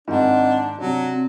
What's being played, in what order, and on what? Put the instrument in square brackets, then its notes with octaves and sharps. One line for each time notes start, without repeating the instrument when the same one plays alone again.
[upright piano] G#2 D#3 [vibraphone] C4 D#5 F#5 [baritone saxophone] D4
[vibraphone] A5
[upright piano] C3 D4 [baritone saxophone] F#3
[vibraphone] C4